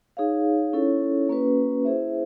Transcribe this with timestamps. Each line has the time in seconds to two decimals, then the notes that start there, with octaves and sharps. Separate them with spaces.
0.17 D#4 G#4 C#5 F5
0.73 C#4 E4 A4 C#5
1.29 A#3 C#4 F#4 B4
1.85 E4 G#4 C5 E5